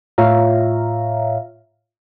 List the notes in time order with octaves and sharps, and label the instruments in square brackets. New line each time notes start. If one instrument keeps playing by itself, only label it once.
[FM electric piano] A2 F4 C#5 E5 F5 A#5